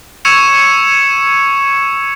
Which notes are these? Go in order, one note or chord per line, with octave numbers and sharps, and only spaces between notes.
C#6 E6 G#6 C#7 E7 F7